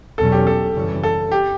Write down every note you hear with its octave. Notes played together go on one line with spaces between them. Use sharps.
E2 B2 F#3 C#4 A4
G4
A4
F#2 C#3 E3 G3 C#4
A4
G4